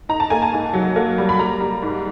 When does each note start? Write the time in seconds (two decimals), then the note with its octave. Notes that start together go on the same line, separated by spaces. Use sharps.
0.09 D#4 A#5
0.20 A5
0.30 A#3 G#5
0.42 A5
0.53 G#2
0.74 F#3
0.96 A#3
1.18 G3
1.29 B5
1.39 A#3 A#5
1.60 G3
1.83 G#2